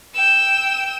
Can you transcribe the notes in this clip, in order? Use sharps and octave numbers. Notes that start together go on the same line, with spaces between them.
G5 E6